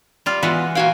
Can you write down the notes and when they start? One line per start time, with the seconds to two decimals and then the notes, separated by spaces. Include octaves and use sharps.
0.26 G3 F4
0.43 E3 G#3 B3 F4 F#4
0.75 A#2 F#4 F5 G5 G#5